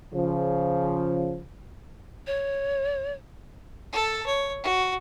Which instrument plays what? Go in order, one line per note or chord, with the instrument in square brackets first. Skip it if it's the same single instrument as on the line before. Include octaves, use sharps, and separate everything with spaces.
[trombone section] C#3 F3
[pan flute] C#5
[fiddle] A4 A5
C#5
F#4